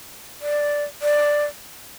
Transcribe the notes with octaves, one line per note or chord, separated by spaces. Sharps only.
D5
D5